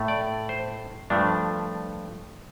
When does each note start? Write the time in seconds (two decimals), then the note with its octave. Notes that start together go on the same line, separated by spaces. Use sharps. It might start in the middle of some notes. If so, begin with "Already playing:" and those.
Already playing: A2 A3
0.08 D5
0.49 C5
1.10 G2 F3 A3 D4